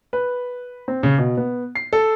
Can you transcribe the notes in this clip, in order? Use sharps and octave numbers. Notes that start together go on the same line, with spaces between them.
B4
C4
C#3
B2
B3
C7
A4